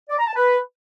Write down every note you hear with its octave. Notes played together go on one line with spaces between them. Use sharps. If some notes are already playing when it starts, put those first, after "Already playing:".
D5
A#5
A5
B4